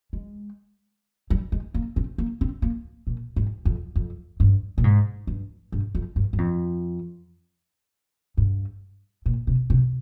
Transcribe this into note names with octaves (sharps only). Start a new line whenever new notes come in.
G#3
G3
G#3
A#3
C4
A#3
C4
A#3
A#2
G#2
F2
F2
G2
A#2
G#2
G2
G2
F2
G2
G2
F2
G2
A#2
C3
C3